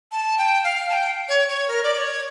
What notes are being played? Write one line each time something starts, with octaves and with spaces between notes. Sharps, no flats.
A5
G5
F5
A5
G5
C#5
C#5
A#4
D5
D5
C#5